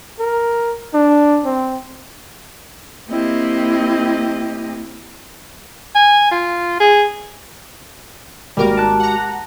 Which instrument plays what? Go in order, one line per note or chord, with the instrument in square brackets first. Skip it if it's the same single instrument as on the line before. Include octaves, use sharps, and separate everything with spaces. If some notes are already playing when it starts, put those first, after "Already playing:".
[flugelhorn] A#4
D4
C4
[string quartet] A#3 C4 E4 G4 D#5
[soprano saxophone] G#5
F4
G#4
[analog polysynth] G#1 A#4 D6 [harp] G3 A#3 [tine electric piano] G#3 F#4 G4
[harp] A5 F#6
[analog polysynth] F#5 A#5